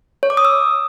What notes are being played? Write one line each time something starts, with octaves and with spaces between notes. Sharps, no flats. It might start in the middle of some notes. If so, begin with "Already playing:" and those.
C#5
D6
D#6
E6